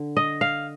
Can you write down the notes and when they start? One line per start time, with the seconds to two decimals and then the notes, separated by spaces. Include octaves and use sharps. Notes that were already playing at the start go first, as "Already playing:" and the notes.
Already playing: D3
0.17 D#5
0.41 F5